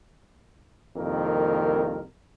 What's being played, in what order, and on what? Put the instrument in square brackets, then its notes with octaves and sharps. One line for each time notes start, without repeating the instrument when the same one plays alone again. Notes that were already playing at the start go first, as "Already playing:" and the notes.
[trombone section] C2 F2 D#3 A#3 A#4